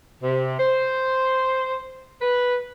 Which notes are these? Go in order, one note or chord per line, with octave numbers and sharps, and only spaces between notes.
C3
C5
B4